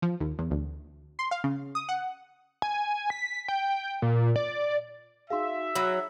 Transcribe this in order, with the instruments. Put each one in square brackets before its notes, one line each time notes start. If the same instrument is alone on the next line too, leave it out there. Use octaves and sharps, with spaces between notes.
[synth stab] F3
D#2
E2
D2
C6
F5
C#3
D#6
F#5
[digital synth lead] G#5
B6
G5
A#2
D5
[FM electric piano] D#4 F#4 G#4 [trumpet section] E5 [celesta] F5 C6
[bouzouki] F#3 [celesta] B5 E6